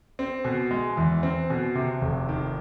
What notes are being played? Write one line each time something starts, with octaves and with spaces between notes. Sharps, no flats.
C4
B2
G#3
E2
C4
B2
C3
F1
D#3